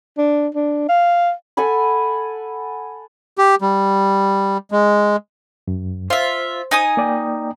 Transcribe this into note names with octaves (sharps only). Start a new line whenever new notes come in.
D4
D4
F5
A4 F#5 G#5 B5
G4
G3
G#3
F#2
F4 C5 E5
D#4 G#5 D#6
A#3 D5 G5